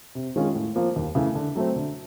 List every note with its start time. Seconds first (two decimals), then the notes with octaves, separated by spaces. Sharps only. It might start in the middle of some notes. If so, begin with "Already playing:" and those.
0.15 C3
0.36 D#3 G#3 C#4 F4
0.55 A2
0.76 F3 A#3
0.96 D#2
1.15 C#3 E3 A3
1.35 D3
1.56 F#3 A3 C4
1.76 D3